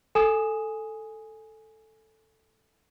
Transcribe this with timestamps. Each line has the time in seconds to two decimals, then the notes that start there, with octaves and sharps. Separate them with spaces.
0.15 A4 G#5 D#6 E7